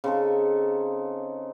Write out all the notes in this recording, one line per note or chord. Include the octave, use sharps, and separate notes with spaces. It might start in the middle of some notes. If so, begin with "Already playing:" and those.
C#3 C4 D#4 A4